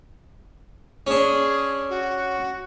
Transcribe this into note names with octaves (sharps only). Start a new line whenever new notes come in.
C#4 D4 G#4
F#4